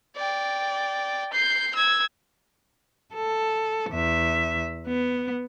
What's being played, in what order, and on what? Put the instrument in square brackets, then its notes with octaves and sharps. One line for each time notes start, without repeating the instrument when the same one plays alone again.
[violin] D5 G5
G6 C7
E6 G#6
[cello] A4
E2 E5
B3